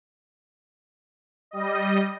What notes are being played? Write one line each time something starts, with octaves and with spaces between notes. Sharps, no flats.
G3 D#5